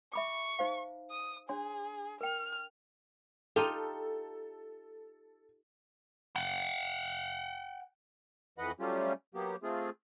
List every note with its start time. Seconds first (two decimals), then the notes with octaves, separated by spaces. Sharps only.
0.13 E5 B5 C#6 D6
0.59 D#4 C5 F5
1.11 D#6
1.49 D4 G#4 C#5 C6
2.21 A#4 G5 F6
3.56 D#4 F4 G4 A4
6.36 F#5 G5
8.58 F2 E3 B4 D#5 F#5 B5
8.80 F#3 G3 A3 C#4 F4 G4
9.35 F#3 A#3 B3 G4
9.63 A3 C4 F4 G#4